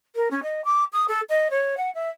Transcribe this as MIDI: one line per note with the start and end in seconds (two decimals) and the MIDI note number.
0.16 0.28 70
0.31 0.41 61
0.43 0.64 75
0.65 0.84 86
0.93 1.05 87
1.08 1.21 69
1.29 1.48 75
1.51 1.75 73
1.77 1.90 78
1.95 2.09 76